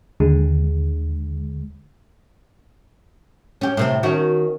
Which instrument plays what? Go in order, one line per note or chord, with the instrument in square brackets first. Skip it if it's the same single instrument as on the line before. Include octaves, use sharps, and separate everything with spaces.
[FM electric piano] D#2 D3 G#3
[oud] C#4 G4
A2 C3 C4
D#3 C#4 F#4